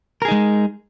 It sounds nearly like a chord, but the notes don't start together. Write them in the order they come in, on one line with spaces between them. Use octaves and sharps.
A#4 G#4 D#4 G#3